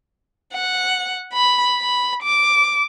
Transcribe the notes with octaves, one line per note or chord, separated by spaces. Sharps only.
F#5
B5
B5
D6